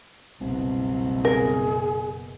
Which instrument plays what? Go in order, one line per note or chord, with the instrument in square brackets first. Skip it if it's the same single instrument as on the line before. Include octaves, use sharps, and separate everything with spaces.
[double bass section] F#1 B2 [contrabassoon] C2
[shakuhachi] G#4 [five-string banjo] A#4